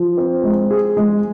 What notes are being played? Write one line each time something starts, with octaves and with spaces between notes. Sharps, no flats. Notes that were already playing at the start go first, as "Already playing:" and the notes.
Already playing: F3
C4
G#3
G#4
G#3